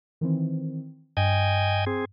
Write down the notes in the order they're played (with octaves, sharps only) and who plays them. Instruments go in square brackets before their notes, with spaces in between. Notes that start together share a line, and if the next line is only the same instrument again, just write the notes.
[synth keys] D#3 E3 C4
[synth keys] G2 [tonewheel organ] D#5 G5 G#5
[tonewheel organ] C4 G#4